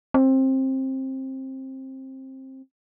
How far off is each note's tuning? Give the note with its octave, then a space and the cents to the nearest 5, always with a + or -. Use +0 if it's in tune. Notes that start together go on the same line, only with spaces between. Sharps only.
C4 +20